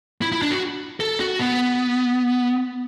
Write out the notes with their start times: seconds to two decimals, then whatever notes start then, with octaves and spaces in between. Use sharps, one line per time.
0.22 E4
0.32 E4
0.42 D4
0.51 F#4
1.00 A4
1.20 F#4
1.39 B3